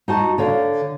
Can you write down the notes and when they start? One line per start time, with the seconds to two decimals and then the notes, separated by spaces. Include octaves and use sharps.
0.08 D#4 F#4 A5
0.38 D3 C#5 F5